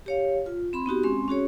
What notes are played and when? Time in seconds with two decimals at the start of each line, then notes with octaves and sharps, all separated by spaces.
0.06 G4 C#5 F5
0.46 F4
0.73 C4 B5 C6
0.86 B3 D#4 F#4 G4
1.03 G#3 C4 C#4 C6
1.28 C#4 F#4 G#4 C#5